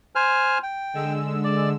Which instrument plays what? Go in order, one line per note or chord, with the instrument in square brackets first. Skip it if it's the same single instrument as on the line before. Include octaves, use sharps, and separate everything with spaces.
[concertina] C5 G#5 F6
G5
[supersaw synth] D3 G#3 E6
[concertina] D5